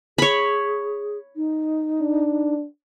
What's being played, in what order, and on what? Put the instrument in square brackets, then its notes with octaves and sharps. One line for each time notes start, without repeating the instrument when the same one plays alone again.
[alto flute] G#4 [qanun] C#5 B5
[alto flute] D#4
[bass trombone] D4